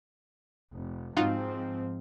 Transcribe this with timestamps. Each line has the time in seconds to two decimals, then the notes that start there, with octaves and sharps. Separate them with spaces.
0.73 F1
1.17 G#2 F3 C4 D#4 F4 F#4